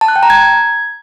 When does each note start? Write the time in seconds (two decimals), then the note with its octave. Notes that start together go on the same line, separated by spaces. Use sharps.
0.01 A5
0.08 F#6
0.16 G5
0.23 A#5
0.30 G#6